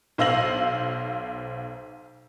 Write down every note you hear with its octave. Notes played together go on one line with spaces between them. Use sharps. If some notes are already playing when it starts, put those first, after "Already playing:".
B1 C5 F5 E6 A#6 F#7